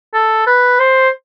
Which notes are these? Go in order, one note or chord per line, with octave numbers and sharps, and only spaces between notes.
A4
B4
C5